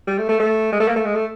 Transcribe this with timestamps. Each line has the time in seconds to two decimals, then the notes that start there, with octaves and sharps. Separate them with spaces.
0.07 G3
0.18 A3
0.29 A3
0.40 A3
0.72 G#3
0.80 A3
0.88 A#3
0.96 A3
1.05 G#3
1.15 A3